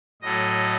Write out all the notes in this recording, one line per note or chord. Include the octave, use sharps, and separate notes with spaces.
A2 F#3 A3 D#5